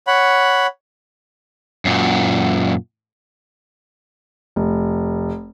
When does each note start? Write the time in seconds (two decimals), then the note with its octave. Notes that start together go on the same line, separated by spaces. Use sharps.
0.07 C#5 F#5 B5
1.85 F#2 A#2
4.56 F1